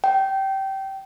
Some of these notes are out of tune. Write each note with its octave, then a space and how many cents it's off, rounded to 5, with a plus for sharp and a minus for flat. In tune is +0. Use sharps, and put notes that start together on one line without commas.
G5 -20